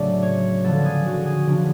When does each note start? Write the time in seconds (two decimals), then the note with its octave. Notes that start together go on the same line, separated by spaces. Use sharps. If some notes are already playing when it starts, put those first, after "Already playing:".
Already playing: A2 C#3 F#3 A3 D4 D5
0.22 C#5
0.64 D3 F3 B3 A4
0.85 G#4
1.06 F#4
1.26 G#4
1.46 C#3 F3 B3 D4